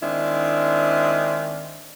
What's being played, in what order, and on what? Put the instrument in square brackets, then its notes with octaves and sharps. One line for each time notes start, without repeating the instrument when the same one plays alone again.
[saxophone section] D#3 G#3 C4 D4 E4